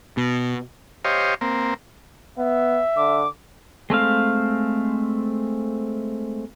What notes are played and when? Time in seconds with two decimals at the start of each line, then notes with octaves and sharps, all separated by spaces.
0.17 B2
1.05 G4 C5 C#5 D#5 F5
1.41 A#3 C4
2.38 B3 E5
2.97 D3 D6
3.90 G#3 A3 C4 F5